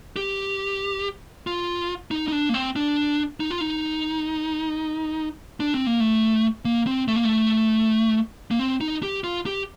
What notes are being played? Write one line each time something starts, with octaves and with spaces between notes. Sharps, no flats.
G4
F4
D#4
D#4
D4
A#3
C4
D4
D#4
F4
D#4
D4
C4
A#3
A3
A#3
C4
A3
A#3
A3
A#3
C4
D#4
G4
F4
G4